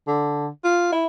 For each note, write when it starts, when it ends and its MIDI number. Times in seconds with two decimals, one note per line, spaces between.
0.07 0.47 50
0.64 0.92 65
0.92 1.05 64